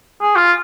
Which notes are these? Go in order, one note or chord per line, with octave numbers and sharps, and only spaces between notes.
G#4
F4